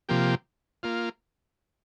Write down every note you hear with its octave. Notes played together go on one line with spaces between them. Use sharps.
C3 F3 A#3 G4
A#3 F4